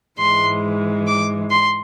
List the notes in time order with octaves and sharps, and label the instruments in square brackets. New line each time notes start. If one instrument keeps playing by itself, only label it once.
[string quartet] G#2 E3 G#3 C6
D6
C6